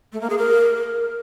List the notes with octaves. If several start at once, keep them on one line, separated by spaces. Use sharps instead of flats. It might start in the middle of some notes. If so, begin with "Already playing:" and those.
A3
A#3
G#4
A#4